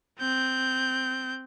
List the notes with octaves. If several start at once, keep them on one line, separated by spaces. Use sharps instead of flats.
C4 G6